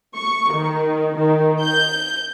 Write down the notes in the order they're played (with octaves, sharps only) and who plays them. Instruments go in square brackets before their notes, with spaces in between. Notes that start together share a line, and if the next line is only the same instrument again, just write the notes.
[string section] C#6
D#3
D#3
G6